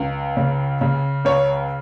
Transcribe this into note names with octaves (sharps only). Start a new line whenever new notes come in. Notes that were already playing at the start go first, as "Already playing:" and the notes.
Already playing: C#2
C#3
C#3
C#2 C#5